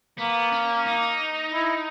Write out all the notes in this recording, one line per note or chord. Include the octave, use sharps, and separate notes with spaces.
A#3 B3
C#4
D#4
E4